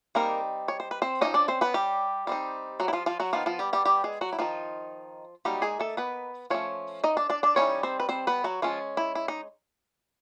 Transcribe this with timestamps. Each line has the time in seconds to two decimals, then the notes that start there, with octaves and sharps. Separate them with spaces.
0.15 G3 A#3 C4 D#4 A#4
0.68 C#5
0.80 C5
0.91 B4
1.02 C4 C5
1.21 F3 A#3 C#4 D#4 D#5
1.34 D4 D5
1.48 C4 C5
1.61 B3 B4
1.74 G3 G4
2.27 G3 C4 D#4
2.80 F#3 F#4
2.88 E4
2.93 F3 F4
3.06 F3 F4
3.20 F#3 F#4
3.33 D#3 F3 B3 F4
3.46 F3 F4
3.59 G3 G4
3.73 G3 G4
3.85 G3 G4
4.04 G#3 G#4
4.21 F#3 F#4
4.33 E4
4.39 D#3 F3 D#4 F4
5.45 F#3 G3 A#3 D#4 G4
5.62 G#3 G#4
5.79 A3 A4
5.97 B3 B4
6.50 F3 A3 C#4 C#5
7.04 D#4 D#5
7.17 D4 D5
7.30 D4 D5
7.43 D4 D5
7.56 E3 G3 C4 C#4 D#4 C#5
7.83 C4 C5
8.00 B4
8.09 C4 C5
8.27 B3 B4
8.44 F#3 F#4
8.62 F3 G#3 C#4 F4
8.97 E4
9.15 E4
9.28 D#4